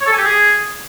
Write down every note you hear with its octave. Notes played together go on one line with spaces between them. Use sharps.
C#5
A4
G#5
G4
G#4